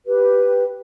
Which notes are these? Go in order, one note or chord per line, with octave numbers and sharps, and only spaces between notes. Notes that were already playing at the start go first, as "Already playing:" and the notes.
G4 B4